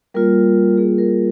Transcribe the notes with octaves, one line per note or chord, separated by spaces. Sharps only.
G3 A#3 F4 A#4
G3 A#3 F4 G#4
A#4